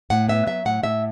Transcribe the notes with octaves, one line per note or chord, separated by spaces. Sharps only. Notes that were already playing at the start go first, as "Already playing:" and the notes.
A2 F#5
B3 E5
F#3 E5
A2 F#5
A2 E5